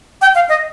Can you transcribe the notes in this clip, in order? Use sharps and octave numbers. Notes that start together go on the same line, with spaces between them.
G5
F5
D#5